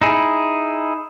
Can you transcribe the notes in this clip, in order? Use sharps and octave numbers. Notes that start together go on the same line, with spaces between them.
D#4 E4 G#4